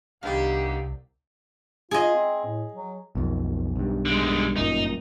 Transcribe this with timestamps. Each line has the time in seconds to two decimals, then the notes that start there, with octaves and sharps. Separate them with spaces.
0.23 C2 D3 D#3 B3 G4 F5 G5
1.91 F4 G#4 D#5
2.15 C4
2.45 A2
2.73 F#3
3.15 B1 F2
3.76 B1 G2
4.05 D3 G#3
4.56 G1 F#2 A#2 D#4